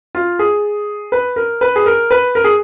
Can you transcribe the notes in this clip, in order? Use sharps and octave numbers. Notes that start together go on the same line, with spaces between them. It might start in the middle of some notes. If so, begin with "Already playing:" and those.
F4
G#4
B4
A#4
B4
G#4
A#4
B4
A#4
G#4